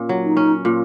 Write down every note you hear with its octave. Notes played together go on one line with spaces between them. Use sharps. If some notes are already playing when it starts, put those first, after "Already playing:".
Already playing: A#2 C#4
F#3
D#4
C#4
A#2 F4